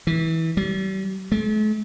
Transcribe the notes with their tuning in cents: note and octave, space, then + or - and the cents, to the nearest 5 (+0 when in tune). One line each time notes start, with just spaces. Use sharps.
E3 -25
G3 -40
A3 -45